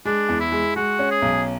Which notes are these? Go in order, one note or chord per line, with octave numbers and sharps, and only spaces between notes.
G#3 D4
E2
E4
G#3
G#3 F#4
C#4
G#4
B1